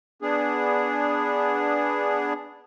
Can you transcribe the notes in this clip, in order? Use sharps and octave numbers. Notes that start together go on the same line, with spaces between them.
B3 D4 G#4